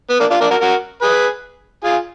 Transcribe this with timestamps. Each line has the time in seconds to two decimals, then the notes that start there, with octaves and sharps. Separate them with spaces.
0.10 B3
0.20 A#3 D4
0.30 D4 F4
0.41 A#3 D4
0.51 F#4 A#4
0.61 F#4 A#4
1.02 G#4 B4
1.84 F4 G#4